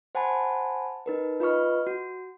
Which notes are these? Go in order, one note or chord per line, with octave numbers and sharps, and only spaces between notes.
C5 F#5 G#5 A5 B5
D#4 A#4 B4
F4 B4 D#5 C#6 F6
F#4